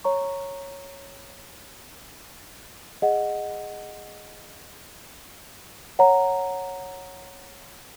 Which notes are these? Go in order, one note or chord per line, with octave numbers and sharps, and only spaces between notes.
C#5 A#5 C#6
G#4 D#5 F#5
C#5 F#5 A#5